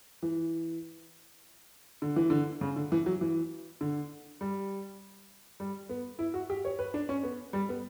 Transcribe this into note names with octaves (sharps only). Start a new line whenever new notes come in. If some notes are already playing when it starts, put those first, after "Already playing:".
E3
D3
E3
D3
C#3
D3
E3
F#3
E3
D3
G3
G3
B3
E4
F#4
G4
C#5
B4
D4
C#4
B3
G3
B3